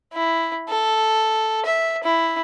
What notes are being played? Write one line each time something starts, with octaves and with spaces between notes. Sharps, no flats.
E4
A4
E5
E4